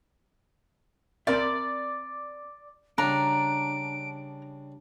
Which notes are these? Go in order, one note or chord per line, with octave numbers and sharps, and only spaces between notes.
C4 A#4 D5 E5
C#3 G3 D4 A#5 D7